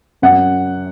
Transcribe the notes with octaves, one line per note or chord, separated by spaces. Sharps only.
F#2 F#5